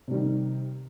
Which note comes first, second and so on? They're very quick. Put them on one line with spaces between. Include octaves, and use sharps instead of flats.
C3 G3 D#3